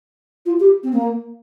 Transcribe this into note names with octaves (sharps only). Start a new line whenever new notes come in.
F4
G4
C4
A#3